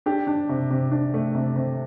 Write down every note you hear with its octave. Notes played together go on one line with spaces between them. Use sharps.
D4 G4
D4
C3
C3
D4
A3
C3
C3